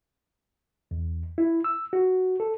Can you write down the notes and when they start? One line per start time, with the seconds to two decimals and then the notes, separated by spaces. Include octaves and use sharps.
0.91 E2
1.38 E4
1.64 E6
1.93 F#4
2.40 A4